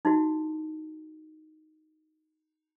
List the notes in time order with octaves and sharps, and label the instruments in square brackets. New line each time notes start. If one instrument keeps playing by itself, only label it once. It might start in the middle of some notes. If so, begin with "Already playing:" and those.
[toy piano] D#4 E4 F#4